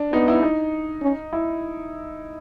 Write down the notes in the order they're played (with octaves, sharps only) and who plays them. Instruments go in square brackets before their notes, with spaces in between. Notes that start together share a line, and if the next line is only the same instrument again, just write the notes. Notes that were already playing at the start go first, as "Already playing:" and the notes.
Already playing: [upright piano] D4
[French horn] B3 [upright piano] D#4
[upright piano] E4
D#4
[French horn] C#4
[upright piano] E4